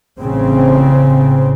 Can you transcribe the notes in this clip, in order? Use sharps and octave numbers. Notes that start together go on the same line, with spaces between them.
A1 C#3 C4